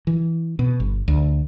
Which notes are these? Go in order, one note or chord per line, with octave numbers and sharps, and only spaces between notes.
E3
B2
G1
D2